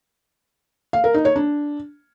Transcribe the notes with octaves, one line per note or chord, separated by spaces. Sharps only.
F5
A#4
D#4
C#5
D4